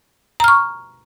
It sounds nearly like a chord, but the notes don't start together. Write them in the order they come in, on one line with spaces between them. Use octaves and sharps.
A#5 F6 C#6